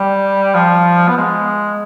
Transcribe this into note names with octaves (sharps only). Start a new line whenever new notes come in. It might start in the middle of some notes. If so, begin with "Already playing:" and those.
Already playing: G3
F3
B3
G#3